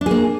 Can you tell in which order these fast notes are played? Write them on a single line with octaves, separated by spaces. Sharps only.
D4 G#4 A#3